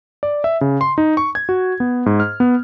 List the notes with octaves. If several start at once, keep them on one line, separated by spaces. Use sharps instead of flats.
D5
E5
C#3
C6
D#4
C#6
G#6
F#4
B3
G#2
F6
B3